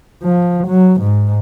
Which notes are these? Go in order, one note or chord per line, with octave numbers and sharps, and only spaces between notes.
F3
F#3
G#2